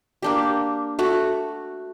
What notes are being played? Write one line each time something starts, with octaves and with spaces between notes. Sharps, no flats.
A#3 D4 G4
A3 F#4